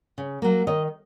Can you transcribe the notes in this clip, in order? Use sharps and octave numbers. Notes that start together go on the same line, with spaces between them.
C#3
F#3 A#3
D#3 D#5